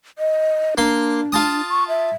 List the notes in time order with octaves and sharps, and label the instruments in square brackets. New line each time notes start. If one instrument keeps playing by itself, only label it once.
[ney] D#5
[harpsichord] A#3 C6 [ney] D4
[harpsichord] F4 A5 D#6
[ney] C#6
E5